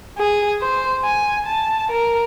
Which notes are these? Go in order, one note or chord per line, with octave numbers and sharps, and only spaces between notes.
G#4
C5
G#5
A5
A#4